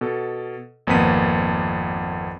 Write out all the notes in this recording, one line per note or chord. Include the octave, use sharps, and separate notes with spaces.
B2 A4
G#1 F2 A#3 B3 B6 D#7